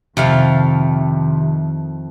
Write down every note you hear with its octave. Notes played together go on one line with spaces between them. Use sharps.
F2 C3 D#3 A3 F5